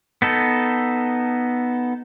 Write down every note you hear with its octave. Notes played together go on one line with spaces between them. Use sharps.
B3 D#4 A4